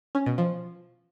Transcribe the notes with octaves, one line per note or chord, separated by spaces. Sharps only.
C#4
B2
F3